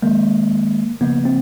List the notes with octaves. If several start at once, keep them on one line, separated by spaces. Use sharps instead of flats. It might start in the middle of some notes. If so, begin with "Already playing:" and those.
D#3 G#3 A#3
C#3 F3 A#3 B3
C4